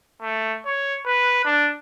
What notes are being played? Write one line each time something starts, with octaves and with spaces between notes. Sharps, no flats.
A3
C#5
B4
D4